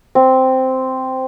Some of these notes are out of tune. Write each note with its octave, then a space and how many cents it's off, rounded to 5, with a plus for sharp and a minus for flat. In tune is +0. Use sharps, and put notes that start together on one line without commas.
C4 -5